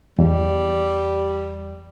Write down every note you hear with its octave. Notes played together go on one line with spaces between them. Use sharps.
E2 G3